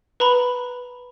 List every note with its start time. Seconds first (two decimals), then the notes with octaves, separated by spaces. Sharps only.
0.20 B4 A#5 B5